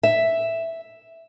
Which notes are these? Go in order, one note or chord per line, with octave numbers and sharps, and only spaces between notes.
E5